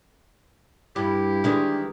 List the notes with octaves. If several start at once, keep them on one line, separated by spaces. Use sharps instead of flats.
G2 E4 G4
D#3 E3 G#3 D4